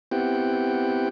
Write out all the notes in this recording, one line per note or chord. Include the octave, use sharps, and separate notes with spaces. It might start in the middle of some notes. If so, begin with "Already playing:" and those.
B3 C4 E4 G4 F#5 G5